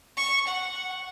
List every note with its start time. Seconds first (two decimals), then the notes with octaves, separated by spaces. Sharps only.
0.17 C#6
0.47 F#5